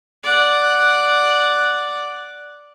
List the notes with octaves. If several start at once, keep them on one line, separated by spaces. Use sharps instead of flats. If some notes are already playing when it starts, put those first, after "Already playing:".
D5 F#5